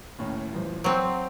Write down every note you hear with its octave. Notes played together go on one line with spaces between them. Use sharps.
D#2 A2 C#4
D#1 A1 F3
F#3 C4 C6 G6 D7